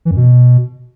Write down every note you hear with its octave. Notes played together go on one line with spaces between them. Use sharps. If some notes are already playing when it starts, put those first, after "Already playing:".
E3
F#2
B2